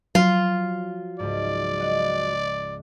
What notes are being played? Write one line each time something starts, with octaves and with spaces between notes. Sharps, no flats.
F3 F#3 F4
C#2 G#2 D5
D#5 F#5